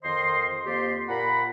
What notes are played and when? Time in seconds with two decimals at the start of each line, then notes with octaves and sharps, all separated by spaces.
0.03 F2 D#3 C5 D#5 C6
0.66 F2 A#3 G4 D5 C6
1.08 A#2 F#5 A#5 B5